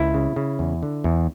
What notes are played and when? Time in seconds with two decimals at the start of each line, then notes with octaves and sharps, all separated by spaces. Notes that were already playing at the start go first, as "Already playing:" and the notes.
Already playing: C#2 E4
0.14 C#3
0.36 C#3
0.59 E2
0.83 D3
1.04 E2